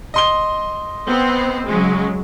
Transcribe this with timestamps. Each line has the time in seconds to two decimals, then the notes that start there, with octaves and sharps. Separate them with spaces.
0.14 D#5 C6 G7
1.07 B3 C4 C5
1.66 C#3 F#3 G#3